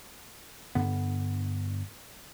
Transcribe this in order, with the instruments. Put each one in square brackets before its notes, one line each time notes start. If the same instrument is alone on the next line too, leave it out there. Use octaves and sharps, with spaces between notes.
[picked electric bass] G2 D3 B3